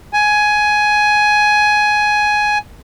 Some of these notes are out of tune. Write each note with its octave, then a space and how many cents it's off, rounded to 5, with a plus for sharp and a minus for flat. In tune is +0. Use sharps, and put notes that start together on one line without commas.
G#5 +10